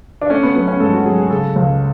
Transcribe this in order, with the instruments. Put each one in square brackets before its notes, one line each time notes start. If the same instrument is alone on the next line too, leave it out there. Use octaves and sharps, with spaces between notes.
[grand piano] D4
A3 C#4
B3
F#3 B3
C#4
G#2 A4
F#4
F#3 G#4
G#4
C#3 A4
C#2